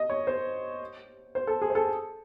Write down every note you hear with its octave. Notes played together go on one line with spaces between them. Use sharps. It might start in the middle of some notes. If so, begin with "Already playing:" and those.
Already playing: D#5
C#5
C5
C5
A4
G#4
C5
A4